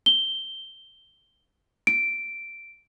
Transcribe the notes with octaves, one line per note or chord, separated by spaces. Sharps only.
G7
D7